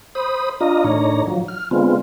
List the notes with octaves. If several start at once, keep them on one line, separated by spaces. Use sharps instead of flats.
C5 B5 D#6
D4 F4 D#5 A#5
A2 D#3 D4 C#5 A#5
F3 F#3
F6
D3 G#3 B3 C4 F4